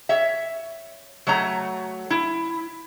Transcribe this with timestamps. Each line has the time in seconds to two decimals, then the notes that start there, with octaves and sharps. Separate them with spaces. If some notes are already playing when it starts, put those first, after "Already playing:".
0.09 C#5 E5
1.27 F#3 A3 C#5 A#5
2.10 E4